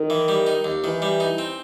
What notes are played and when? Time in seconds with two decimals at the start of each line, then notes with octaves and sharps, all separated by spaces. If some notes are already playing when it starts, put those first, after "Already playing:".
Already playing: D#3
0.10 E3
0.28 G3
0.47 D#4
0.64 D#2
0.84 D#3 E3
1.02 G3
1.20 D#4
1.38 C4